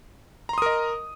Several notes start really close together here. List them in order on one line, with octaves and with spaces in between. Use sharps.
A#5 C6 D#6 A#4 D#5